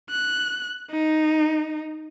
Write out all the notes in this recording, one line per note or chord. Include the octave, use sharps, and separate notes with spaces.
F#6
D#4